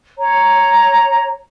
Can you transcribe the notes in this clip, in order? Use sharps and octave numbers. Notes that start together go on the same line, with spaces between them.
C#5 A#5